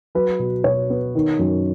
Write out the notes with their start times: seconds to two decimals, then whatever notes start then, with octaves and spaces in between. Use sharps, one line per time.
0.15 F#3 B4
0.39 B2
0.64 B2 C#5
0.90 B3
1.15 D#3
1.39 F#2